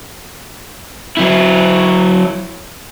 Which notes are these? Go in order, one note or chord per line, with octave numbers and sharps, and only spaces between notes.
F#3 E4